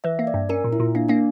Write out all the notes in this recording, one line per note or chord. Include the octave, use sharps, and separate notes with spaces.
E3 E5
A#3
D5
G2
C#4 A#4
A#2
E4
A#2
A#3 D4
A#3 D4